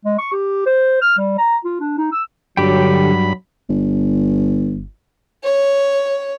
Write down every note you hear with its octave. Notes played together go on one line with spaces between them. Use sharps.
G#3
C#6
G4
C5
F6
G3
A#5
F4
D4
D#4
E6
G2 D3 F#3 G4 G5 B5
G1
C#5